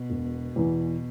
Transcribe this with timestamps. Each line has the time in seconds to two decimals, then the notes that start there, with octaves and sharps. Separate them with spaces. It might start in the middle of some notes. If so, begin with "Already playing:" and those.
Already playing: B2
0.10 E1
0.56 E2 E3